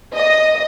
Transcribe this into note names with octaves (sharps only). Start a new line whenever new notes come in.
D#5